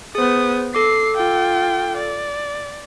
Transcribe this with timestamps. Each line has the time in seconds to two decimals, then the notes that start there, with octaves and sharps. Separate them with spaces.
0.15 B3 G#4 C5 D#6
0.75 A4 D6 C7
1.16 F4 G5
1.97 D5